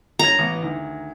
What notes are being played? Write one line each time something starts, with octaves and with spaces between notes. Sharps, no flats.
G2 C#5 A#5 G#6
A1 B3
D2 D#3